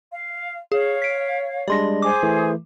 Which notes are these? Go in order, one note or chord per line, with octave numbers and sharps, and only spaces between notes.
F5
G#4 C#5 F5
B6 D7
G3 G#3 D4 D5 C6 A#6
G#4 C5 D6
E3 A3